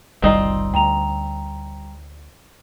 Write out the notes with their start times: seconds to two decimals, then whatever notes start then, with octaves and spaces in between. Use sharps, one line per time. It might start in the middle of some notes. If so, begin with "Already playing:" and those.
0.22 F#1 C2 D#3 G3 C4 D#4 F4
0.74 D2 G5 A#5 F7